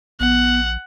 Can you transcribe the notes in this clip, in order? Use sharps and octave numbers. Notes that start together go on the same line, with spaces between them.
A#1 B3 F#5